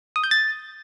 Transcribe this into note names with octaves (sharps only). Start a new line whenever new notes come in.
D#6
G6
A6